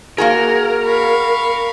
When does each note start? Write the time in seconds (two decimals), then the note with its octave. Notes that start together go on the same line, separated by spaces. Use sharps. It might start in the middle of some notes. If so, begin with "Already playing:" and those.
0.18 A#3 F#4 G#4 A#4
0.85 F5 B5 C#6